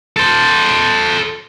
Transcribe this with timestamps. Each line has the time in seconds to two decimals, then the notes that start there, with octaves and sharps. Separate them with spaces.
0.16 A4 C5